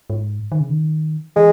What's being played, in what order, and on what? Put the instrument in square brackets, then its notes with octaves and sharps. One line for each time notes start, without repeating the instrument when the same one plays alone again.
[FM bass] G#2
D#3
C#3
D#3
[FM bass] E3 [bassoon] G#3